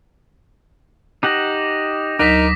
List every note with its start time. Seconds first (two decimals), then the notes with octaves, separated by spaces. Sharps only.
1.23 D#4 G4 F#5 D6 D#6 A#6
2.19 D2 F#3 D#4 A#4 D6 A#6 B6